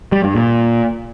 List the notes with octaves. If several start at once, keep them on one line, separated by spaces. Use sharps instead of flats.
G3
G2
A#2